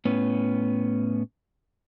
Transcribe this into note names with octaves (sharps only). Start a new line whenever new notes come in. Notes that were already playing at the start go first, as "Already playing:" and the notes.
A2 B3 C#4